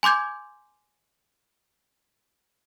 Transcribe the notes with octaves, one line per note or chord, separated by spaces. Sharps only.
G#5 C6 D6 G6 G#6